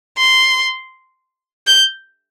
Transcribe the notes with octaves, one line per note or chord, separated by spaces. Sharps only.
C6
G6